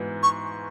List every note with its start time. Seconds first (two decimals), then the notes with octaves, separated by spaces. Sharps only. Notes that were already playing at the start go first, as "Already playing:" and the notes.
Already playing: G#2 E3 B3 F#4
0.23 C#6